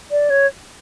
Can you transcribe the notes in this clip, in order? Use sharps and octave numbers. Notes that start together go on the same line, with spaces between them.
D5
C#5